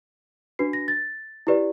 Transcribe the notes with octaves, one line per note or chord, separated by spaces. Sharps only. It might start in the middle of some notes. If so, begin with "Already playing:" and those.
D4 F#4 B4 C7
A#6
A6
E4 G4 B4 D5